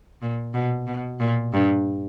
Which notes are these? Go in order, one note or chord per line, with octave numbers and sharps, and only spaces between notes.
A#2
B2
B2
A#2
G2